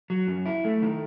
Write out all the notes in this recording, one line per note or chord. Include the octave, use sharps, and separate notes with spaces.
F#3
F#2
E4
A3
D#3